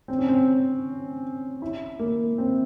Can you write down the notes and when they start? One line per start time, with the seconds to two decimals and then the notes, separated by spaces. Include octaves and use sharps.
0.08 C4
0.19 C#4
0.29 C4
1.62 E4
1.99 A#3
2.38 C4